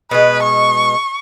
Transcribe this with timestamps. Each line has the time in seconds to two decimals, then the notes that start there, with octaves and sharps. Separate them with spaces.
0.11 B2 G#3 B4
0.42 C#6